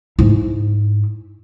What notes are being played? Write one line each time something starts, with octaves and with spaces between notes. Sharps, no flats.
G#2 E4